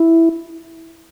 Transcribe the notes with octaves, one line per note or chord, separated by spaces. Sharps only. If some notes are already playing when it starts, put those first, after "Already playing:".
Already playing: E4